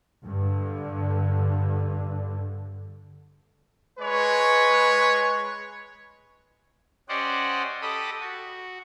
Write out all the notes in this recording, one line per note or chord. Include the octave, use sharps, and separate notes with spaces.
G2 D3
G#3 B4 C#5
C#4 G4 C5 D5 D#5 F#5
G4 A4 D#5 B5 D#6
F#4